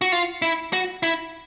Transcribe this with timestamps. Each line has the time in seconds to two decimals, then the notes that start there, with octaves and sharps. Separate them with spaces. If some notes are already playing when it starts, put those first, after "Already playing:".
0.02 F#4
0.12 F4
0.42 E4
0.73 F#4
1.03 E4